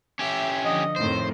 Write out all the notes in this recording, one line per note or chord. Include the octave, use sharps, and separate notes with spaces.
C#4 G4 E5
D3 F3 D#5
F2 A2 D#3 C5